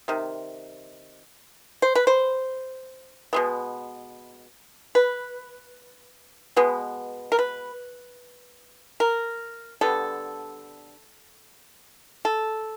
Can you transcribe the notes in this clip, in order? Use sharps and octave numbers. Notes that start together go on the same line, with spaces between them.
C3 D#3
C5
B4
C5
B2 G#3 B3
B4
B2 G#3 B3
A#4
B4
A#4
D3 G3 B3 A4
A4